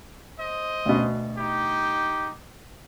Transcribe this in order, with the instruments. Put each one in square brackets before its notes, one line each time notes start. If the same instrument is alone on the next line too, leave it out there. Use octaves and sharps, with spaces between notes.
[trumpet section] C5 D#5
[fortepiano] D2 B2
[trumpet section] D#4 G4